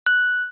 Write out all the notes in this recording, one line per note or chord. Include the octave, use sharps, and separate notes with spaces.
F#6